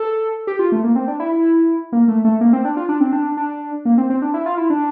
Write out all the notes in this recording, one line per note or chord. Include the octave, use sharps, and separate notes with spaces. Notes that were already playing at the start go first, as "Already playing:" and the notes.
Already playing: A4
G4
F4
A3
A#3
C4
D4
E4
E4
A#3
A3
A3
A#3
C4
D4
F4
D4
C4
D4
D4
A#3
C4
C4
D4
E4
F4
E4
D4